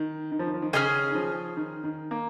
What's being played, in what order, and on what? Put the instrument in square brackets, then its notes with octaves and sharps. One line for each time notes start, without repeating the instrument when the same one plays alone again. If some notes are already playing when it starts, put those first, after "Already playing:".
Already playing: [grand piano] D#3
D#3
F3
D#3
F3
D#3
[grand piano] C#3 [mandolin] C#4 G#4 D#5 G#5
[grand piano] D#3
F3
D#3
D#3
A#3